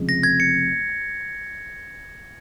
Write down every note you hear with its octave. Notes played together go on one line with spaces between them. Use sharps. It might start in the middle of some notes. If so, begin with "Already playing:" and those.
Already playing: F1 F2 C#3 G#3 C4
A#6
G#6
C#7